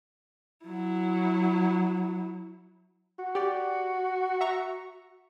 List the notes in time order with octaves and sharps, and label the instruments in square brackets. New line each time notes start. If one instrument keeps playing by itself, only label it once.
[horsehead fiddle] F#3 E4
[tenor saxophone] F#4
[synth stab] G4 D5
E5 A#5 C#6